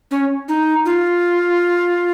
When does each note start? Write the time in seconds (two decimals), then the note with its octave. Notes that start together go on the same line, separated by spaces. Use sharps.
0.11 C#4
0.48 D#4
0.85 F4